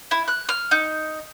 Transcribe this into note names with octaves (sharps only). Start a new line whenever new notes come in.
E4
F#6
F6
D#4